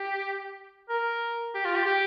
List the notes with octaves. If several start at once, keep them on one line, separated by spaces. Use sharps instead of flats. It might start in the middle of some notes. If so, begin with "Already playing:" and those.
Already playing: G4
A#4
G4
F4
G4
G4